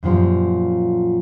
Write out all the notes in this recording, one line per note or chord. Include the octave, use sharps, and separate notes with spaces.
F#2 A#2 F3 G3